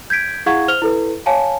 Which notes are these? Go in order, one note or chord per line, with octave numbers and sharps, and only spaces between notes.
G6 G#6 B6 D7
E4 G#4 F5 F#5 C#6 G#6
C5 F6 F7 G7
E4 A4 B4
C#5 F5 G#5 A5